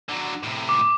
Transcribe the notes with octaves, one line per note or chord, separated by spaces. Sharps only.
D3 F#3
A2 C3
D6